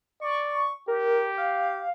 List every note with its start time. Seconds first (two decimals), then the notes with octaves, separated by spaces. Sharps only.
0.21 D5 C#6
0.88 G4 A#4
1.38 F5